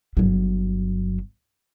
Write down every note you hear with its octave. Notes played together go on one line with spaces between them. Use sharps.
G1 F#3